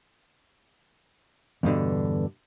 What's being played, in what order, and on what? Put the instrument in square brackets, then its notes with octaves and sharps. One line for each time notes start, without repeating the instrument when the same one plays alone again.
[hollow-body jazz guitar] E2 G2 B2 D3